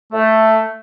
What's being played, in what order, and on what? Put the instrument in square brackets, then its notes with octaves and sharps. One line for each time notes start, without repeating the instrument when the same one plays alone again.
[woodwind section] A3